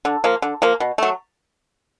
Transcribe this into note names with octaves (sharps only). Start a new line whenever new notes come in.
D3
F3 A#3
D3
F3 A#3
B2
F#3 A3